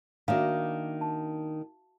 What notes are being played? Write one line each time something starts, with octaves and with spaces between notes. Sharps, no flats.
D#3 A#3 D4 F#4 E5 F5
A5